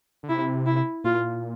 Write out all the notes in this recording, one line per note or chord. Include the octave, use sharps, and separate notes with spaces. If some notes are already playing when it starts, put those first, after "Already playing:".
D3
C3 E4
E4
A#2 F4